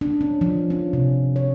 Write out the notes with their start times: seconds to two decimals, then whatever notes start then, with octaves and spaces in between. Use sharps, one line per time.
0.01 D4
0.21 C#4
0.41 F3
0.70 C#4
0.93 C3
1.36 C#5